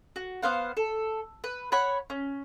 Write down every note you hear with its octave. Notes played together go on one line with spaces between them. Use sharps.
F#4
B3 C5 F5 F#5
A4
B4
C#5 F#5 B5 C#6
C#4